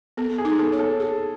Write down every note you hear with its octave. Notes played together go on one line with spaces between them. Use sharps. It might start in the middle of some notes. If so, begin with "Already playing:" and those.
B3 A4
G#4
D#4
A4
C#5
A4
G#4